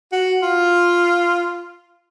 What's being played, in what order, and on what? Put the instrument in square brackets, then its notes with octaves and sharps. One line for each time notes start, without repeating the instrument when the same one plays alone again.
[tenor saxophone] F#4
F4